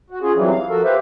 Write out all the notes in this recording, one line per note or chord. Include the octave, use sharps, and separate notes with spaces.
F#4
C#4 F4 G#4
F2 C3 E3 F#3 G3
F5
F3 F#4 A4 A#4
G4 B4 C5 E5 F5